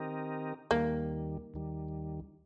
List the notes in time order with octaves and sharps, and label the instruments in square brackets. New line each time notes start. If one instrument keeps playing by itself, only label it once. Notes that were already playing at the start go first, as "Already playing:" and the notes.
Already playing: [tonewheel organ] D#3 C4 G4 A#4 D#5
[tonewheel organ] D#2 D#3 G3 [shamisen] A#3
[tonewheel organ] D#2 D#3 G3